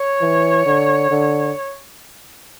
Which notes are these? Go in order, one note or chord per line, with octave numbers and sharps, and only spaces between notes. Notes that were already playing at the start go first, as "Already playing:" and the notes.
Already playing: C#5
E3
D3
D3